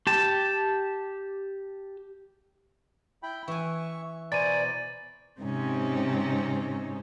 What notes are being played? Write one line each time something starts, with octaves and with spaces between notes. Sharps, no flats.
G4 A5
E4 G5 B5
E3 E5 G#5 C#6
B2 C5 D5 G#5 A#5 A6 D#7
G#2 C3 C4 C#4 D#4